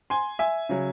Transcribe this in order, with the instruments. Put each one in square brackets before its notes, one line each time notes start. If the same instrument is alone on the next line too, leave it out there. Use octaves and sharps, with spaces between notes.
[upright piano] G#5 C6
E5 G#5
C#3 F#3